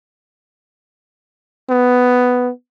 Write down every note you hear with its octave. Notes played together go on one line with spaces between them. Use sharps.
B3